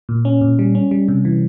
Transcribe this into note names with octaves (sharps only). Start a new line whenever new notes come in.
A#2
C#4
A#2
G3
C#4
G3
C3
E3